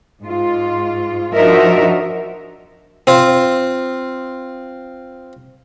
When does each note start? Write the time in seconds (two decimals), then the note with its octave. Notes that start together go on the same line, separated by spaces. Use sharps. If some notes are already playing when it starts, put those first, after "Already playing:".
0.23 G#2 F4
1.35 F3 D4 D#4 F#4 A#4 E5
3.07 C4 F4